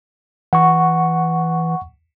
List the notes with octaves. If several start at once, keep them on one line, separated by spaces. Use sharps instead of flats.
E3 F#5 C#6